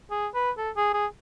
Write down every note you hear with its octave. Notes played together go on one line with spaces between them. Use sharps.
G#4
B4
A4
G#4
G#4